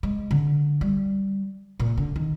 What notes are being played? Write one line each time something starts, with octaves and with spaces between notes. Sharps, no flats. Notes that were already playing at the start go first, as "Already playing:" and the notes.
G#3
D3
G3
A#2
D3
D#3